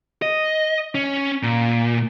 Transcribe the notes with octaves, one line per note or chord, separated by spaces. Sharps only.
D#5
C#4
A#2